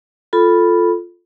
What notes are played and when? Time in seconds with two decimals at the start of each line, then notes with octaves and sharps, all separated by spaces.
0.33 F4 A4 B5